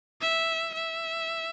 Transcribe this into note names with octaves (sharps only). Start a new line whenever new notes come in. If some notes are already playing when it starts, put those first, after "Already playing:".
E5
E5